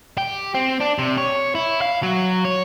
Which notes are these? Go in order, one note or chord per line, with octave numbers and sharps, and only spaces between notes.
G4
C4
D4
C3
C#5
E4
F5
F#3
C#5